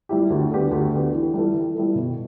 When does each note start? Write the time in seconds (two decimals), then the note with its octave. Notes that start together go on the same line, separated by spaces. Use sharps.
0.09 G3 E4 G4
0.30 D2
0.51 D3 B3 G4
0.71 D2
0.93 D3 B3 G4
1.13 E3
1.34 G3 E4 A4
1.54 E3
1.75 G3 E4 A4
1.95 B2